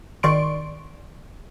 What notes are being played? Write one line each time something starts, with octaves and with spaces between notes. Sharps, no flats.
G#1 D#3 D5 C6 C#6 D7